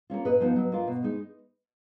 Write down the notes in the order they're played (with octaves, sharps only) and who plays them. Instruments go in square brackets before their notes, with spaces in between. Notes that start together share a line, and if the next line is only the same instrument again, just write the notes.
[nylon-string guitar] A#3 C#4 F4
A#2 B4 D#5
F3 B3 D#4
F#3
A#3 F4
B2
G#3 D#4